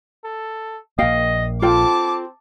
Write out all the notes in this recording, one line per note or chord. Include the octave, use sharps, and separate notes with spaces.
A4
A#1 A#3 D#5 F5 G5
C4 F4 A4 G5 A5 D6